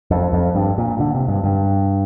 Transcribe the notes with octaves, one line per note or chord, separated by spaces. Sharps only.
F2
F2
G2
A#2
D3
C3
G2
G2